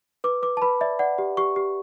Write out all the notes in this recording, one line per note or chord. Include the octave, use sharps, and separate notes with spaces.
B4 D6
B4 D6
A5
B4 B5
D5 E5
D5 F#5
G4
G4 C#6
G4